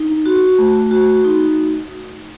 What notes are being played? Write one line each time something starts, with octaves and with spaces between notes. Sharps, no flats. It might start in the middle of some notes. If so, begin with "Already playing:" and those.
Already playing: D#4
F#4
A3
F#4
D#4